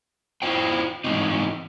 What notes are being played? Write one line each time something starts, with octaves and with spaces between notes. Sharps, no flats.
E4 F4 C5 G5
G#2 E3 F#3 G#3 C4 D#4